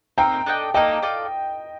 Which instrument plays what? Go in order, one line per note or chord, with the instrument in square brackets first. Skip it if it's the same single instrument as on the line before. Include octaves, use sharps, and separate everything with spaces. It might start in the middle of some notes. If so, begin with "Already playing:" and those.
[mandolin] C4 D#4 A#4 [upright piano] G5 A#5
[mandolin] D4 A4 D#5 G5
[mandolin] A#3 D#4 A4 D5 [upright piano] D#5 G5
[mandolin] F4 A4 D5